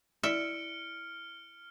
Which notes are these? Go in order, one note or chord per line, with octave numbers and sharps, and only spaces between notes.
E4 D5 E5 F6 C#7 D7